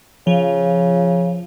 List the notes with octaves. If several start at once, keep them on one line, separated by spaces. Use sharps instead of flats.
C#3 F3